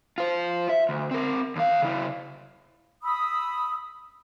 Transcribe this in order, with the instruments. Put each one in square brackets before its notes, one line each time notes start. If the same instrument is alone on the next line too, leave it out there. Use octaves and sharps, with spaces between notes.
[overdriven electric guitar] F4 C5
E5
D2
C4 A#4
D#2 F5
C#3 E4
[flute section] B5 D#6 E6